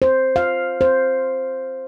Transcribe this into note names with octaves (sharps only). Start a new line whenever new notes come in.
C5
F5
C5